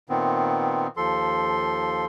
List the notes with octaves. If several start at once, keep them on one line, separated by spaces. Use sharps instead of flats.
A#2 D#3 B3 C4
D#2 F3 A4 C6